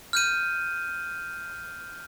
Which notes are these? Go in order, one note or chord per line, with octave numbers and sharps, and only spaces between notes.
F6 G6 D#7